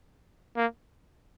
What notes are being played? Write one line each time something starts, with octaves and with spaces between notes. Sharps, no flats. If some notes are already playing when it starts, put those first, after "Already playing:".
A#3